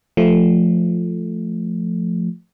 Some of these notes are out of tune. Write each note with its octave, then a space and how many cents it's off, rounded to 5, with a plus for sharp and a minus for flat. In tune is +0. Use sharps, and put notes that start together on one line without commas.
F3 +0 A3 +0